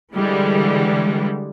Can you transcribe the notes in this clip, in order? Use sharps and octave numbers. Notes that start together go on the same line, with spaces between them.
D3 E3 G3 G#3